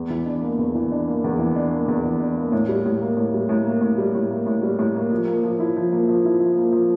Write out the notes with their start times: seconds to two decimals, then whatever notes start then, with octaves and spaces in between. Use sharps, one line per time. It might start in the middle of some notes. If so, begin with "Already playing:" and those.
Already playing: E2
0.10 E3
0.26 D4
0.42 A#3
0.59 E2
0.75 E3
0.91 D4
1.08 A#3
1.24 E2
1.39 E3
1.56 D4
1.72 A#3
1.88 E2
2.05 E3
2.20 D4
2.37 A#3
2.52 A2
2.69 G3
2.86 A2
3.02 A#3
3.17 A2
3.34 G3
3.49 A2
3.66 A#3
3.81 A2
3.98 G3
4.15 A2
4.30 A#3
4.46 A2
4.63 G3
4.79 A2
4.96 A#3
5.11 F3
5.27 A#3
5.43 F3
5.60 E4
5.76 F3
5.92 A#3
6.08 F3
6.25 E4
6.40 F3
6.57 A#3
6.72 F3